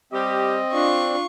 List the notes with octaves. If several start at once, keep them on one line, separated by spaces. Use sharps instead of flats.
G3 C4 G4 D#5
D4 F4 C#6